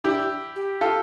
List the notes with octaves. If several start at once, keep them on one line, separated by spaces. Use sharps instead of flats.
D4 E4 G4
G4
F4 A4